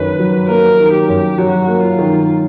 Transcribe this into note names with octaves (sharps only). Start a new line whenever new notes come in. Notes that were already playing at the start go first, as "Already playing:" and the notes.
Already playing: F#2 D#3 F#3 B4
F#3
A#3 A#4
D#3
G4
F#2
F#3 F#4
A#3
F4
D#3